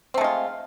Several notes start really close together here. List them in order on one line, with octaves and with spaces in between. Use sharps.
C4 A3 G#3 F4